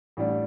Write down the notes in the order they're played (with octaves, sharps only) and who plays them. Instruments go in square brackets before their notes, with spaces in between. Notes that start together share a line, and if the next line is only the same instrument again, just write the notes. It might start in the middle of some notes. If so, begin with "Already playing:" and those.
[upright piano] A1 A2 G3 D4